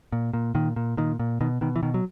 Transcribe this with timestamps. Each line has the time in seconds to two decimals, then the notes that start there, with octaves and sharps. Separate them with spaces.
0.12 A#2
0.33 A#2
0.55 A#2 D#3
0.76 A#2
0.97 A#2 D#3
1.19 A#2
1.41 B2 D#3
1.61 B2 D#3
1.76 E3
1.83 B2 D#3
1.94 F#3